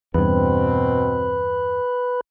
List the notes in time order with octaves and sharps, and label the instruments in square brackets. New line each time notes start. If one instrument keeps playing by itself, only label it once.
[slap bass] E2 G2 [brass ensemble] B2 C4 [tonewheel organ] B4